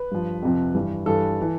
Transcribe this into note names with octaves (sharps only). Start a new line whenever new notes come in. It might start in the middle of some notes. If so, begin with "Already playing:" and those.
Already playing: B4
G2 F3
F2 C3 F3
G2 E3
G2 E3 A4
E3